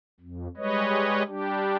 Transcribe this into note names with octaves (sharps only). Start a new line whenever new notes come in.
F2
G3 G#3 B4 C#5 D#5
G3 D4 G4